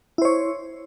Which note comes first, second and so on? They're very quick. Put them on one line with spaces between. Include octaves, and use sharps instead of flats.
E4 C5 C#5